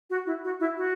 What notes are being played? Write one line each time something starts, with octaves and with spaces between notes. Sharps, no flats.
F#4
E4
F#4
E4
F#4